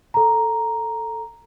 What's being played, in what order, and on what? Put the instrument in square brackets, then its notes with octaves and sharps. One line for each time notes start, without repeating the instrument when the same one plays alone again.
[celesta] A4 A#5